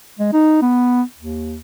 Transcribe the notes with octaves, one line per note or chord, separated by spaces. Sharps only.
G#3
D#4
B3
D#2